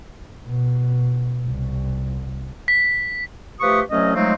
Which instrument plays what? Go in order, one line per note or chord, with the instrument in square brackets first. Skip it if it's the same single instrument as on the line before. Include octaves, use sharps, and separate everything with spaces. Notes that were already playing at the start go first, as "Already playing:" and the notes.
[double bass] B2
C2
[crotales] B6
[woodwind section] F3 A3 G4 B4 C#6 D#6
C2 F#3 A3 C#4 D#5
F3 F#3 G#3 A3 C4 D#4